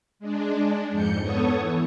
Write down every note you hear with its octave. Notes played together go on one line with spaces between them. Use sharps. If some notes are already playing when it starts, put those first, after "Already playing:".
G#3 D4
F2 G#2 G6 C#7
B3 A4 C#5 C#6 D#6
E3